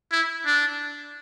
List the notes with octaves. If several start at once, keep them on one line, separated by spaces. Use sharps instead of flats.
E4
D4